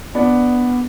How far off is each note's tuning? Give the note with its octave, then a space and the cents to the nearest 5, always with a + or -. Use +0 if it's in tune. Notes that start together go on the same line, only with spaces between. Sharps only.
B3 +0 D4 +0